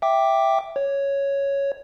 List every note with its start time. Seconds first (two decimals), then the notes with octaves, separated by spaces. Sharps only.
0.02 E5 G5 D6
0.76 C#5